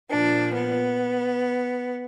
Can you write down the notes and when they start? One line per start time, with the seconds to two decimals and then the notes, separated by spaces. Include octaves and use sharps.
0.10 A#2 F3 D4
0.54 B3